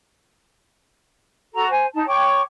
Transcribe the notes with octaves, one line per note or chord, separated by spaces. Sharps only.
F#4 A4 A#5
C5 G#5
D#4 A5
C#5 G5 C#6 D6